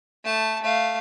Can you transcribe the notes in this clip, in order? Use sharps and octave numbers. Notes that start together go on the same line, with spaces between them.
A3 A5
A3 F5